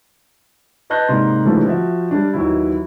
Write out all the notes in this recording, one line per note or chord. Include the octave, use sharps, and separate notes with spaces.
B4 D#5 A5 F#6 G6 A#6
G#2 C3 A#3 D5 C6
G#2 C#3 E3 F3 G3 A3
F3 F#4 E5
G3 D4
D#2 E3 F#3 E4